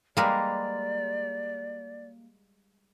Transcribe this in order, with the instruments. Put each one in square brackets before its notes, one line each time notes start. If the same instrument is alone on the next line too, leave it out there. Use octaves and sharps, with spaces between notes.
[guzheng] G3 G#3 [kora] A#3 A#4 B4 [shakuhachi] D5